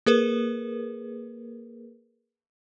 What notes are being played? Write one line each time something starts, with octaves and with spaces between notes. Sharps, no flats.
A#3 G#4 A#4 B4